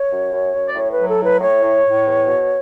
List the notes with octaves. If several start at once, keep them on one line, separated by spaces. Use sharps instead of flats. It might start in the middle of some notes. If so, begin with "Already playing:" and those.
Already playing: C#5
F#2
F#2
F#2
D5
A2 C#5
B4
F#3
A4
A2 B4
A2 C#5
A2
A2
E2
B2